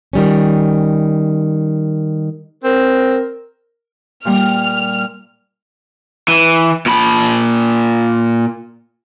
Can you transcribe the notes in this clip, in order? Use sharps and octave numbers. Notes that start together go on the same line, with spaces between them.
D#3 G3 C#4
C4 A#4
A#2 G3 A#3 F6
E3
A#2 B5